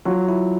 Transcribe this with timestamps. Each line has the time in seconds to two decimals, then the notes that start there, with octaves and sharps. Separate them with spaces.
0.05 F#3 F4
0.29 E4